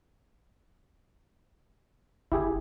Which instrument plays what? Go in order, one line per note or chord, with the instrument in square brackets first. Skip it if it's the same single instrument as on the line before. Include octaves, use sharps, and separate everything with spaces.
[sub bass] F#1 [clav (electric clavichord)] E4 G4 G#4